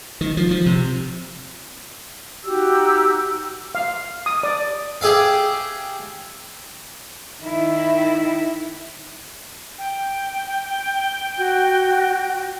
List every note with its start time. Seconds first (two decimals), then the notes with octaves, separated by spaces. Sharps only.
0.21 D#3
0.37 F3
0.51 F3
0.66 C3
2.44 D#4 F#4 G4 E6
3.75 F5
4.26 D#6
4.43 D5
5.01 G4 G#4 E5 F5
7.43 D#3 E4
9.78 G5
11.38 F#4